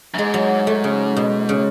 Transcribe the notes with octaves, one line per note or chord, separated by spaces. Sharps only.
F#2
G#2 G#3
F#3
A3
C#3
B2
C#3